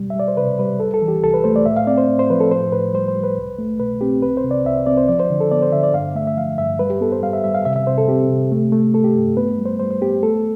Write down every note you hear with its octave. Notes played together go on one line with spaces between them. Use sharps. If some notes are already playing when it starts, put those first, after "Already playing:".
Already playing: B2 G3
E5
G3 D5
C5
C3 B4
G3 B4
C2 A4
A4
E3
G4
C2 A4
B4
A3 C5
D5
A2 E5
F5
C4 D5
C5
A2
C5
F3 B4
A4
A2 C5
A2 B4
G3 C5
C5
G3
B4
C2
A3
B2 B4
C4 G4
C2 B4
C5
C3
D5
C2 E5
C4 D5
C5
F3 D5
C5
D3
A4
B3 D5
C5
D3 E5
D5
G2 F5
A3 E5
E5
F3 F5
G2 E5
G3 B4
G4
B3 A4
C5
G3 F5
E5
G3 E5
F5
C3 E5
E5
C3 C5
A4
C4 G4
C3
A3
A3
A3 A4
G4
G2
B3 B4
G3
C5
G3 C5
C5
B3 G4
A3 A4